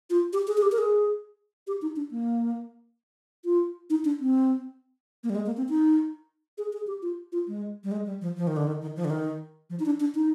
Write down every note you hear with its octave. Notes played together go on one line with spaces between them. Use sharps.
F4
G4
G#4
G#4
G4
A#4
G#4
G4
D#4
D4
A#3
F4
D#4
D4
C4
A#3
G3
G#3
A#3
C4
D#4
G#4
G#4
G4
F4
F4
G#3
G3
G#3
G3
F3
F3
D#3
D3
D#3
D#3
F3
D3
D#3
F3
D#4
D4
D4
D#4